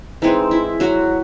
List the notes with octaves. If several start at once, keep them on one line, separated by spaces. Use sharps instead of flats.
E3 G#3 C4 D#4
E4
F#3 F#4